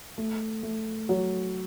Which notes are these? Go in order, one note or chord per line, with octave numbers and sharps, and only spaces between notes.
A3
A3
F#3